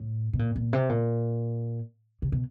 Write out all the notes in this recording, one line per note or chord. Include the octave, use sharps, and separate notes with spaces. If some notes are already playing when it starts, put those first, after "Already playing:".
Already playing: A2
B2
A#2
A#2
C3
A#2
C3
B2